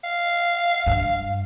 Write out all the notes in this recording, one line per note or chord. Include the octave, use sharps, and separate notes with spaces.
F5
G2